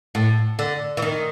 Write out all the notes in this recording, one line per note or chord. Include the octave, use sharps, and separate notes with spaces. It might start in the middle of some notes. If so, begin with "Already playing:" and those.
A2
D3
E3
D#3